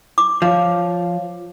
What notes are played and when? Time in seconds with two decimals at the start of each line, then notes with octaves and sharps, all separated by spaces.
0.18 D6
0.42 F3 C#5 F5